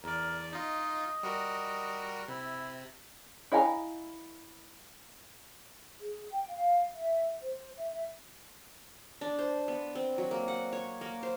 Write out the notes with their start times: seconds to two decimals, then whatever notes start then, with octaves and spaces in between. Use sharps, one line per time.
0.04 E2 A#4 D5
0.53 D#4 F4 D#5
1.23 G3 F#4 A#4
2.28 C3 E4
3.52 E4 D#5 F5 G#5 A#5
5.99 G#4
6.32 G5
6.48 F5
6.94 E5
7.42 C5
7.77 E5
7.91 E5
9.21 D4
9.39 C5
9.68 B3
9.95 C4
10.18 F#3
10.31 A#3
10.48 F#5
10.73 C#5
11.01 A#3
11.23 C5